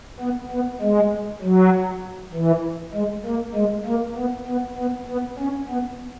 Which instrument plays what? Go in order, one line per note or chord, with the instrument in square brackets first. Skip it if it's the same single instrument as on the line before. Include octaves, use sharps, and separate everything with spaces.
[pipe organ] B3
B3
G#3
F#3
E3
G#3
A#3
G#3
A#3
B3
B3
B3
B3
C#4
B3